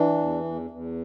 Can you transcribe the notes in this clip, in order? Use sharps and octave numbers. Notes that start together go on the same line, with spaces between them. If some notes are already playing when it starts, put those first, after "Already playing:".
Already playing: E3 D4
E2
E2
E2